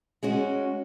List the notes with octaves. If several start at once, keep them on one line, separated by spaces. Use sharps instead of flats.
G#3 C#4 F#4